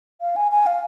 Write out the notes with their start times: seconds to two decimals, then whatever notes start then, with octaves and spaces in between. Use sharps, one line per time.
0.21 F5
0.36 G#5
0.52 G#5
0.66 F5